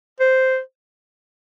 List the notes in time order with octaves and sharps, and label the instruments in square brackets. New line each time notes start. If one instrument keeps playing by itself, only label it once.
[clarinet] C5